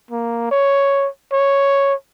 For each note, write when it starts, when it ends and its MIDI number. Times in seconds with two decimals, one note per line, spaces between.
0.11 0.50 58
0.51 1.08 73
1.32 1.94 73